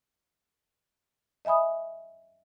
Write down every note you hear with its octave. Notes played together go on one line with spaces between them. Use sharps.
D#5 E5 G#5 B5 D#6